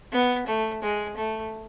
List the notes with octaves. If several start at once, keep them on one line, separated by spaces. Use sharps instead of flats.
B3
A3
G#3
A3